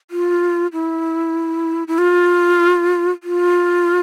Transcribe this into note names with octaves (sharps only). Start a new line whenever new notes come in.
F4
E4
E4
F4
F4